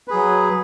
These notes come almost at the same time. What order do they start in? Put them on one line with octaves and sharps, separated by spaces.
B4 G#4 F#3